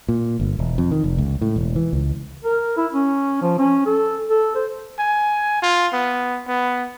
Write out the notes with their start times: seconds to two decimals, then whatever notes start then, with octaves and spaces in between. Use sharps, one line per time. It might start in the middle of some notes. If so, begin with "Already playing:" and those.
0.09 A#2
0.40 G1
0.59 E1
0.78 F2
0.91 D#3
1.04 F1
1.18 C#2
1.42 A2
1.56 E1
1.76 E3
1.93 C#2
2.44 A#4
2.77 E4
2.92 C#4
3.42 F3
3.59 C#4
3.86 A4
4.29 A4
4.55 C5
4.99 G#5
5.62 F4
5.93 B3
6.47 B3